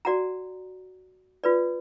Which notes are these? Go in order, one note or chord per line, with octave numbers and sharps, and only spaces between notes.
F#4 D5 F#5 A#5
F4 B4 D5